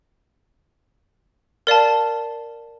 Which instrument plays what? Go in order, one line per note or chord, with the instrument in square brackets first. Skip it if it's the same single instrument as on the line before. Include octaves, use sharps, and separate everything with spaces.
[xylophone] A#4 D5 F5 A5